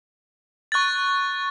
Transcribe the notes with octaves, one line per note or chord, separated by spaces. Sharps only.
C#6 F#6 A6